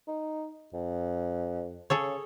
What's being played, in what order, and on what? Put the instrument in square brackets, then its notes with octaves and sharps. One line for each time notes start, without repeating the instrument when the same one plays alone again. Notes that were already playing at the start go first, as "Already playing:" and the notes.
[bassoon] D#4
F2
[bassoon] C#3 [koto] G#4 A4 C#5